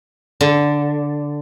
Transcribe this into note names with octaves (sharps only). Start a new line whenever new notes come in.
D3